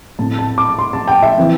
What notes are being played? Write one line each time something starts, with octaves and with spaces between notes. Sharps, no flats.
A2 A3 C4 A5
A5
D6
C6
A5
G5
E5
E3 C4